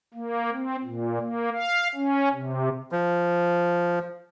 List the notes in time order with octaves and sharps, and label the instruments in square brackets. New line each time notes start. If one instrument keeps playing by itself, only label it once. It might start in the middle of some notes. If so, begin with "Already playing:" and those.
[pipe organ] A#3
C4
A#2
A#3
F5
C#4
C3
[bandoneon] F3